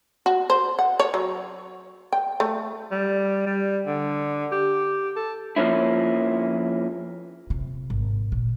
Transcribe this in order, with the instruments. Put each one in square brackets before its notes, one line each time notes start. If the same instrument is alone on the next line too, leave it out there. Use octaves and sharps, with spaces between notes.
[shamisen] F#4
C5
F#5
C#5
F#3
G5
A3
[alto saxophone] G3
G3
D3
G4
A4
[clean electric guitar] F2 F3 A#3 C#4 E4
[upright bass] C3
G#1
A#2